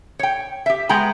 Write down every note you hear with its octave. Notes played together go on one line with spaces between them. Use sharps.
C#5 G5
G4 E5
G#3 B3 G5 A#5